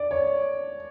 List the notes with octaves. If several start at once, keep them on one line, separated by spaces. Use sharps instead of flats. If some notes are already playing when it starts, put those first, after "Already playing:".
Already playing: D5
C#5